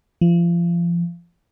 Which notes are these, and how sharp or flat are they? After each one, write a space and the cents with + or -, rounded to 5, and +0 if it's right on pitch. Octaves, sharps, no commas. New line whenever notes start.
F3 -30